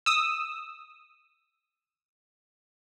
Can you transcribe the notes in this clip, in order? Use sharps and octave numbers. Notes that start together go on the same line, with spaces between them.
D#6 E6